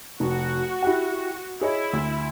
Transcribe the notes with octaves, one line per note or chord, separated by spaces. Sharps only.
F1 F#4
E4 G4 F#5
E4 G#4 C#5 D#5
D2